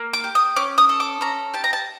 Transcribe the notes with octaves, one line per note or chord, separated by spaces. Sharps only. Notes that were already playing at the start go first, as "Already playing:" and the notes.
Already playing: A#3
D6
G4
D#6
C#4 D6
D#6
A4
D6
C#4 A#5
G4 A5
A#5
A5